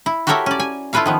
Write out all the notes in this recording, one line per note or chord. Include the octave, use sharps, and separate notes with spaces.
E4
F#4 G4 A4 A#4 C#5 E5
C#4 D5
G#5
E4 F4 A4 B4 C#5 F5
D#3 F3 B3